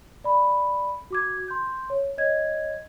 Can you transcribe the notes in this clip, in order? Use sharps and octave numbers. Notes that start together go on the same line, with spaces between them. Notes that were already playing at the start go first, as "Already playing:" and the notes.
D5 B5
F#4 D6 G#6
C6 G6
C#5
C#5 D#5 G#6